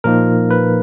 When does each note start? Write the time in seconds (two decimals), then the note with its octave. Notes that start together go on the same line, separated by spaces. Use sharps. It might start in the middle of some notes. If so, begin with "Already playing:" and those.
0.04 A#2 F3 A#3 D#4 A#4
0.51 B4